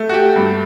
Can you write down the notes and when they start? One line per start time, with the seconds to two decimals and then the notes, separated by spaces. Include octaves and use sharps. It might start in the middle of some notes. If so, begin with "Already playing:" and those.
Already playing: A3
0.09 F#4
0.14 G4
0.36 G2